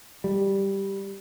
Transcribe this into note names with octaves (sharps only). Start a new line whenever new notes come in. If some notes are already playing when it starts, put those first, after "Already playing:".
G3